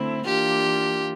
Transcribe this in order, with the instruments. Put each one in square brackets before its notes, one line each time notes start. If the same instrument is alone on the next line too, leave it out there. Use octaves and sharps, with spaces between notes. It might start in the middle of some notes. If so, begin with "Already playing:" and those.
Already playing: [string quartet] D3 A3 C4 E4
[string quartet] E3 A#3 D4 F4 [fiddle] G4